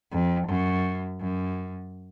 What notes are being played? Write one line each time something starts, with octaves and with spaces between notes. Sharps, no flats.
F2
F#2
F#2